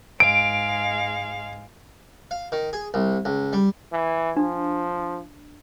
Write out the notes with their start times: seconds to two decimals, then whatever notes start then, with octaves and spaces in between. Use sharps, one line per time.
0.20 G#2 G#3 F5 D7
2.31 F5
2.52 D#3
2.73 G#4
2.94 C2
3.25 C#2
3.53 G3
3.92 E3
4.37 F3 D4